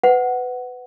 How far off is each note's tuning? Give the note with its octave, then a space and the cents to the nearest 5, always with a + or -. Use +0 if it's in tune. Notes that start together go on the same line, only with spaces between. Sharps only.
B4 +25 F#5 +5